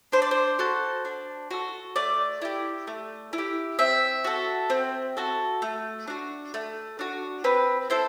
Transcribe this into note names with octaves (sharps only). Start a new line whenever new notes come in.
D4 C5
D5
C5
F#4 A4
D4
F#4 A4
A3 D5
E4 G4
A3
E4
G4
C4 E5
F#4 A4
C4
F#4 A4
A3
D4 F#4
A3
D4 F#4
C4 B4
E4 A4 C5